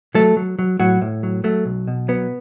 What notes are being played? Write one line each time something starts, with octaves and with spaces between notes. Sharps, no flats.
F#3 A3 A4
F#3
F#3
A2 F#3 F#4
A2
F#3
F#3 A3
B1
B2
F#3 B3